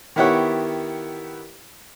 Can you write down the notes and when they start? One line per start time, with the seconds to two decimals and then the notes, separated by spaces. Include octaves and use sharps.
0.16 D#3 B3 E4 G4 C#5 F#5